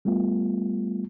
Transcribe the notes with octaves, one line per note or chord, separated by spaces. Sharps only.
G3 A3 B3 F4